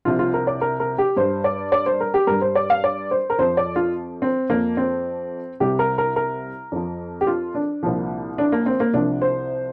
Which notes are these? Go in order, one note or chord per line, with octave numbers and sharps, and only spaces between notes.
C2 C3 F3 F4
F4
A#4
D5
A#4
A#4
G4
G2 G3 C5
D5
D5
C5
A#4
G4
G2 G3 A#4
C5
D5
F5
D5
C5
A#4
F2 F3 C5
D5
F4
C4
F2 F3 A#3
C4
C2 C3 G3 G4
A#4
A#4
A#4
F2 F3
G4
F4
D4
C2 A#2 F3
D4
A#3
C4
A#3
C2 C3 F3 D4
C5